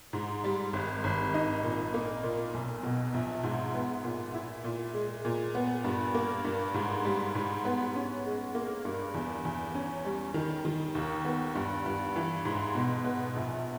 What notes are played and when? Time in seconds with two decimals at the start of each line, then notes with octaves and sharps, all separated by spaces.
0.13 G#2
0.44 G3
0.73 G#1
1.04 G#1
1.34 D#4
1.63 A#2
1.94 A#3
2.23 A#2
2.54 B1
2.83 B2
3.14 A#1
3.43 G#2
3.74 B3
4.04 A#2
4.35 E4
4.64 A#2
4.93 G#3
5.25 A#2
5.55 B3
5.84 G2
6.15 A#3
6.44 G2
6.74 G#2
7.05 G3
7.35 G#2
7.65 B3
7.95 C#4
8.25 G#3
8.55 A#3
8.85 G2
9.14 E2
9.45 E2
9.75 C#4
10.05 G3
10.34 D#3
10.65 D#3
10.95 D#2
11.25 B3
11.55 G2
11.86 G2
12.16 E3
12.45 G#2
12.75 B2
13.05 B3
13.36 A#1